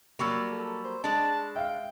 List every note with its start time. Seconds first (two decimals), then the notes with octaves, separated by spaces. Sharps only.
0.19 F#3 G3 A#3 B5 C#6 E6
0.51 A4
0.85 C5
1.04 G#3 D4 A5
1.56 E5 F5 G5